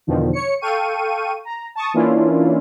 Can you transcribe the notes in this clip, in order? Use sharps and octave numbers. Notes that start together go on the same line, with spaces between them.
E2 B2 D3 D#3 F3
C#5 C#7
A4 F5 G5 C#6 D#7
A#5
A5 C#6 D#6
E3 A#3 C#4 D4 E4 F4